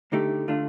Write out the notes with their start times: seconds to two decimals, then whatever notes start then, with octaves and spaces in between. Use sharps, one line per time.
0.12 D2 D3 A3 D#4 G4
0.48 D3 A3 D4 F4